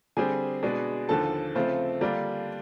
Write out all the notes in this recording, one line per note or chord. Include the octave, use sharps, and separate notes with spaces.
D3 G3 C4 G#4 G#5
B2 G#3 B3 D4
D#2 D3 F3 A4 A5
C#3 F3 A3 C4
D3 G3 A#3 D4 F4